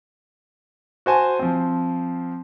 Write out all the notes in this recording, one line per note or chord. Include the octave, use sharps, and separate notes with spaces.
F#4 C5 G#5 A5
F3 C4